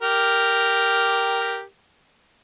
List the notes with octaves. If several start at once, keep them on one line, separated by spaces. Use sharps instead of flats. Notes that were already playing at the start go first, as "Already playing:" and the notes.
G4 A#4